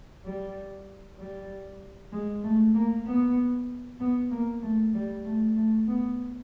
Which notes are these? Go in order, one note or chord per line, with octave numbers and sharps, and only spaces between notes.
G3
G3
G#3
A3
A#3
B3
B3
A#3
A3
G3
A3
A3
B3